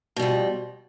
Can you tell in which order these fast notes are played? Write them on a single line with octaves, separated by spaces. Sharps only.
B2 G3 F2